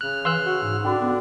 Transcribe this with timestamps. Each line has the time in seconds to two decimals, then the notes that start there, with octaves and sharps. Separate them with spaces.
0.01 C#3 F6 F#6
0.25 E3 B4 F5 C6 E6 F#6
0.45 F#4
0.63 G#2
0.84 D3 C#4 D4 F#4 D6
1.02 B3 D6